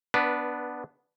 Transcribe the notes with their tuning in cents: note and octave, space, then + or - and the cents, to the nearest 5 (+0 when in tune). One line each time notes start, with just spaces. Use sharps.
B3 +0 D4 +0 B4 -20